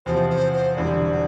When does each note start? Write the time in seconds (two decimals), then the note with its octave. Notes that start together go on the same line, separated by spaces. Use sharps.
0.06 E2 C3 F3 C5
0.30 C5
0.53 C5
0.76 E1 E2 D3 G3 D5